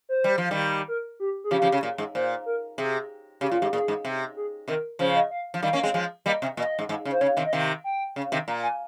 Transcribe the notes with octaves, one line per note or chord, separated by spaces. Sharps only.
C5
G3
F3
D#3 G3
A#4
G4
G#4
C#3 F3 G4
C#3 F3
C#3
A#2
G#2
A#2 C5
A#4
C3 G#4
C#3 G4
A#2 F4
G#2 G4
A#2 G#4
G#2
C3
G#4
C3 D#3 A#4
C#3 F3 C5
D#5
F5
F3
D#3 G3 F5
A#3 C#4
G#3 C4
F3 G#3
G3 A#3 D#5
C3
A#2 D#5
G#2
G#2
C#3
C5
C#3 C#5
C3 D#3
D#5
C3 D#3 F5
G5
C#3
C3 D#3
A#2 A#5
G#5